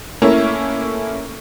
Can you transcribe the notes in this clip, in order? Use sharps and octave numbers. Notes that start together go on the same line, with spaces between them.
A3 A#3 C#4 E4 A#4 C#5